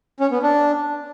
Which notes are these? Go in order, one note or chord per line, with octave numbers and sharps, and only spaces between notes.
C#4
B3
D4